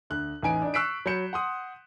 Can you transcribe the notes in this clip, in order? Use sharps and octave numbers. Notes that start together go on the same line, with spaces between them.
D2 F#6
A1 D#4 G#5 D7
D4 D#4
C#6 E6 F#6 B6 C7 D7
F#3 B5 G6 C#7 E7
F#5 C6 D#6